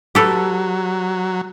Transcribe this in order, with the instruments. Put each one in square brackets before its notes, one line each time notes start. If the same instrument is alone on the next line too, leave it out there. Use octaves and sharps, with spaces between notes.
[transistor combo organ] F#3 [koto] G4 A4 B4